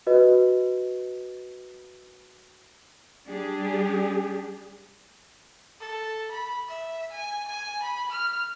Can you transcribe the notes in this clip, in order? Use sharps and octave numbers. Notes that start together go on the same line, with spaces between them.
F#4 B4 D#5
G3 D4 G4 G#4
A4
B5
E5
G#5
G#5
B5
F6